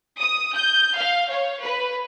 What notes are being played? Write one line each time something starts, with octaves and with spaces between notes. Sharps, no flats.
D#6
G6
F5
C#5
B4